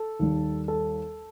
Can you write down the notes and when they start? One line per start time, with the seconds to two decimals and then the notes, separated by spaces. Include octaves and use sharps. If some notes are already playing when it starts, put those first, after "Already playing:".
Already playing: A4
0.19 D#2 D#3 G3
0.68 A4